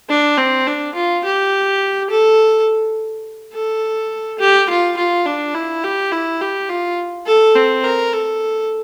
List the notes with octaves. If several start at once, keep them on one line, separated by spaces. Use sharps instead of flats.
D4
C4
D4
F4
G4
A4
A4
G4
F4
F4
D4
E4
G4
E4
G4
F4
A4
C4
A#4
A4